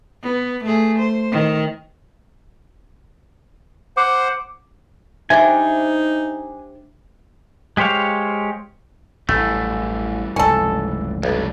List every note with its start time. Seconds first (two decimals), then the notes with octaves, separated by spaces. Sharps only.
0.23 B3
0.64 A3 G#4
0.99 C5
1.31 D#3
3.97 C5 F#5 D6
5.30 G3 D4 D#4 C5 E5 G#5
7.77 G#3 G4 C5 C#5 F5
9.29 A1 F#2 E3 G3 A3
10.36 F1 C#2 G#2 C#4 A4
11.23 B1 E3 G3 D4